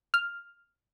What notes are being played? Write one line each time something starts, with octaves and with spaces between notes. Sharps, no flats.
F6